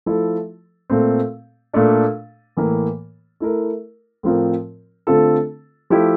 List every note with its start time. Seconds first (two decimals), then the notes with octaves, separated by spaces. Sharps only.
0.06 F3 A3 E4 A4
0.90 A#2 A3 C4
1.74 A#2 A3 D4
2.57 A2 E3 A#3
3.40 A3 E4 A#4
4.23 A2 F3 C4 F4 A#4
5.07 D3 A3 C4 F4 A4
5.90 F3 A3 E4 G4